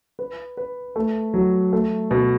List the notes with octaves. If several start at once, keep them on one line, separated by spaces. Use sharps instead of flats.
B4
B4
A3
F#3
A3
B2